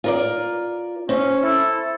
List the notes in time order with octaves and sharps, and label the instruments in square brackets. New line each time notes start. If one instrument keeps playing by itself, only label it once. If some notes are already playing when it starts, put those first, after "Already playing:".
[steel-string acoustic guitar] F4 A#4 D5
[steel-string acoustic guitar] C4 [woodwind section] C#4
[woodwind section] E4 A4